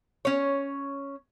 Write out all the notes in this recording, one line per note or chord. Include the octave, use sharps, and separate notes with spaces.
C#4 C#5